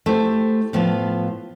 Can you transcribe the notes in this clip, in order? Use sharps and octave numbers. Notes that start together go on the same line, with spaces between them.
A3 E4 G4 C5
A2 F3 B3 F4